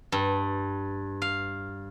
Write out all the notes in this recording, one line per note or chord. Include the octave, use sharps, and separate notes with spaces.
G2
F5